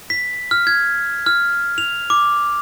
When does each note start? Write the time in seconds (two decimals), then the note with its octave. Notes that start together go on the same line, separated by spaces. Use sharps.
0.10 B6
0.51 F6
0.67 G#6
1.26 F6
1.78 F7
2.10 D6